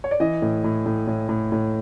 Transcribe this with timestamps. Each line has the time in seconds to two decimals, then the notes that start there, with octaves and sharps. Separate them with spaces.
0.04 C#5
0.11 D5
0.20 E3 D#5
0.42 A2
0.64 A2
0.86 A2
1.07 A2
1.29 A2
1.52 A2